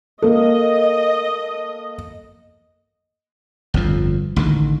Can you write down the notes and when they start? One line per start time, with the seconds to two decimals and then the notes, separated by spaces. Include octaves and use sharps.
0.22 A#3 A4 D#5
3.74 G1 F2 F3
4.36 A1 D3 D#3